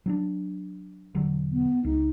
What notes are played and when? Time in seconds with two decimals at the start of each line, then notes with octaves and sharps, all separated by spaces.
0.06 F#3 C#4 D4
1.15 E1 D3 F#3
1.52 B3
1.84 C#2 D#4